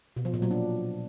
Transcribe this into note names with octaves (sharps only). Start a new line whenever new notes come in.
B2
F3
A#2
F#3
D4